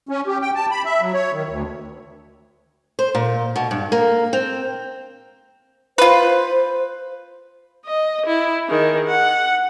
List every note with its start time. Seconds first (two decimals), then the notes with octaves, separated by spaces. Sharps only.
0.09 C#4
0.27 G4
0.41 G5
0.55 A5
0.71 B5
0.85 E5
1.01 F#3
1.14 C#5
1.32 D#3
1.49 D2
2.99 C5
3.15 A#2
3.56 B2
3.71 G2
3.92 A#3
4.33 C4
5.98 F4 B4 C5
7.86 D#5
8.26 E4
8.67 D#3 G#4
9.07 F#5